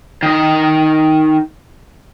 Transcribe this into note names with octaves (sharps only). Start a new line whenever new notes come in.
D#3 D#5